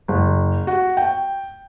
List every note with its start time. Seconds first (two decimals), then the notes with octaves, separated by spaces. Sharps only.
0.08 F#1
0.67 F#4
0.97 G5